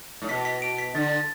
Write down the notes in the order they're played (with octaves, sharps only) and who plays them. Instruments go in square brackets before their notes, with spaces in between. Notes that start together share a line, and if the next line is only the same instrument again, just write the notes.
[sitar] A2
[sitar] B2 [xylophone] B6
[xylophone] B6
D7
B6
[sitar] D3 [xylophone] A6
[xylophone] A6